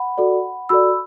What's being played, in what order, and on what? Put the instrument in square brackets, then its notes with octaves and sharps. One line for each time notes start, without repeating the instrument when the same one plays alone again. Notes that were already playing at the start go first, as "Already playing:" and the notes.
Already playing: [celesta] F#5 B5
F#4 A4 D5
F#4 A4 D5 B5 E6